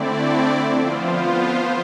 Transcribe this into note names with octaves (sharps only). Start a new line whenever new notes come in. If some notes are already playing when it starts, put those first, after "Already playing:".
Already playing: D3 A3 C4 E4 D5
F3 B3 F4 C5
C5